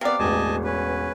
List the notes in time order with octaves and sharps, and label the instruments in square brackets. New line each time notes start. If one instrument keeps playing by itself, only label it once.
[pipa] C3 D5 [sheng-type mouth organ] B3 F5
[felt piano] E1 A1 [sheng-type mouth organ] D#5 G#5 A5
[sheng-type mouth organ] C#4 B4